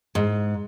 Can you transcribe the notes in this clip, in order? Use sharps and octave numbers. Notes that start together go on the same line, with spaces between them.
G#2